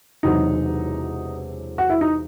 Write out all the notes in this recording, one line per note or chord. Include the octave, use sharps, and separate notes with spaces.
E1 E2 C3 F#3 D#4
F#4
E4
D#4